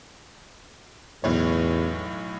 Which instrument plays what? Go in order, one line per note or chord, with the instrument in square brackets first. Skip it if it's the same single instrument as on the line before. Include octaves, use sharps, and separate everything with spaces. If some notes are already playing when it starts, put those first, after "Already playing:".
[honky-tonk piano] B1 A2 C#5 [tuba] E2